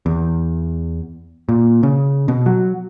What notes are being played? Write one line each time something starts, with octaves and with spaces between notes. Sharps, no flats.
E2
A#2
C#3
B2
F#3